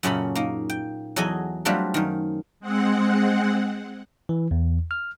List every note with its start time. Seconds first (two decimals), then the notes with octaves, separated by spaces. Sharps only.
0.03 F#2 A#2 C#3 C#4 A4 B5
0.35 A#3 D#4
0.70 G5
1.16 E2 F#3 G#4 A4 D#5 G#5
1.65 F#3 G3 A3 C4 D4 F4
1.94 F#2 D#3
2.60 G#3 C4 F#5
4.29 E3
4.51 E2
4.91 F6